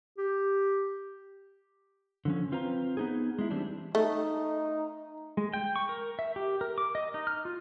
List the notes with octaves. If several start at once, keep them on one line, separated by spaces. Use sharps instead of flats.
G4
D3 F3 C#4
C4 F4 B4 C5 A#5
B3 D#4 G#4
G#3 E4
E3 G3 C4 D4
A3 D#4
G#3
G5
C#6
A#4
E5
G4
A#4
D6
D#5
D#4
F6
F4